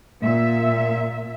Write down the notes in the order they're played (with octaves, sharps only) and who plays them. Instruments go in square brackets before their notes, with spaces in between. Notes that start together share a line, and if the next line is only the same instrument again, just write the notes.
[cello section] A#2 E5